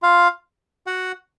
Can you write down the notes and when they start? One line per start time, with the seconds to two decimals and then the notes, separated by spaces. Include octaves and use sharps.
0.02 F4 F5
0.87 F#4 F#5